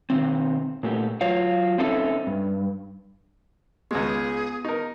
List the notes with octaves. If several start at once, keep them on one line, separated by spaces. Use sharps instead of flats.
B2 D#3 C4
A#2 A3 G4
F#3 F4 C#5 F5
C4 C#4 D#4 A4 E5
G2
C#2 G#3 B3 G#4
D#4 A#4